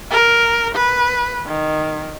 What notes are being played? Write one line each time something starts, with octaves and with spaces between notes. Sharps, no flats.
A#4
B4
D#3